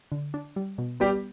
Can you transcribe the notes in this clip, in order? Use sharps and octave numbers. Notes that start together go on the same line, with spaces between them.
D3
D4
G3
B2
G3 B3 G4